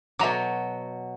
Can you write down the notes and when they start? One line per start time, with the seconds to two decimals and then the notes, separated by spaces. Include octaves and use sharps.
0.19 B2 F#3 E5 A#5 D6